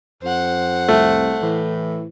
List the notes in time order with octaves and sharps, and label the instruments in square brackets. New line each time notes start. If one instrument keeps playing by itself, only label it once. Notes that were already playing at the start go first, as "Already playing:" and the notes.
[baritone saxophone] F2 [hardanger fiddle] C5 F#5
[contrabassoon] C2 [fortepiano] A3
[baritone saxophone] A2 [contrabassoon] E3